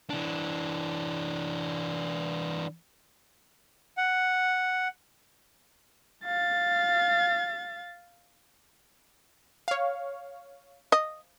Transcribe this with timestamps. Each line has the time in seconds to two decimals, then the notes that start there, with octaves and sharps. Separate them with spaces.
0.10 E3 D4
3.97 F#5
6.25 F5 A6
9.68 C#5 F5
10.92 D#5